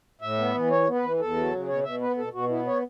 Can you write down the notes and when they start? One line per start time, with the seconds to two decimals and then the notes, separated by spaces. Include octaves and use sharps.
0.22 A2 E5
0.38 B3
0.54 E3
0.71 E2 C#5
0.87 B3
0.95 B4
1.03 E3
1.19 E2 A4
1.36 F#3
1.52 C#3
1.68 B2 C#5
1.84 B2 E5
2.00 B3 B4
2.17 B2 A4
2.33 B2 F#4
2.49 B3 E4
2.67 C#5